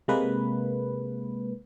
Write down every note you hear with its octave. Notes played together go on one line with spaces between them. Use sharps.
C3 G#3 A#3 B4